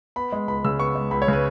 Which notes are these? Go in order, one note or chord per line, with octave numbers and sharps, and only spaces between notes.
B3 B5
G#3
C#2 B5
C#3 E6
B3 C#6
G#3
C#2 B5
C#5
C#3 B4